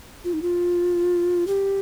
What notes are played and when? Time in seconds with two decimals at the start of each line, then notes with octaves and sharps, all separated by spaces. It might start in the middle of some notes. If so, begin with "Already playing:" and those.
0.24 F4
0.33 D#4
0.42 F4
1.47 G4